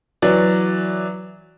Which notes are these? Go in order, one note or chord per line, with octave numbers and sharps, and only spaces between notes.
E3 F#3 D5